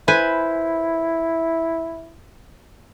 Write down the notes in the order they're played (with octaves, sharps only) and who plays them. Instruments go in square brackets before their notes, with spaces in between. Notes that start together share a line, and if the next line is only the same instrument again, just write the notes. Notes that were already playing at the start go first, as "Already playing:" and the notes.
[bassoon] E4 [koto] B4 C5 G#5